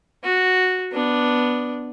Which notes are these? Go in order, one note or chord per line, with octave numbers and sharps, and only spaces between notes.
F#4
B3 D4